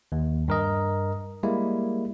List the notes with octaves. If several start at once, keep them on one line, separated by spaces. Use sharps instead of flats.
D#2
G2 A#4 D#5
G3 G#3 A#3 E4